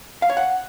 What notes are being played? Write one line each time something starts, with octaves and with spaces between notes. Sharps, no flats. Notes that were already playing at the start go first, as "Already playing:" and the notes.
F5
C#5
F#5